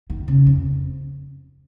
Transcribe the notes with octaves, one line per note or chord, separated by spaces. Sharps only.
D#3
C#3
F2